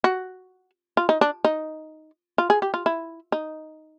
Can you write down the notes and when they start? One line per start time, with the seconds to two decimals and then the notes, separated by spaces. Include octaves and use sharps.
0.04 F#4
0.97 F4
1.09 D#4
1.21 D4
1.45 D#4
2.38 F4
2.50 G#4
2.62 G4
2.74 F4
2.86 E4
3.32 D#4